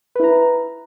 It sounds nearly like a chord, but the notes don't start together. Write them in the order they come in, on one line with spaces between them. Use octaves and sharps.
B4 E4 A#5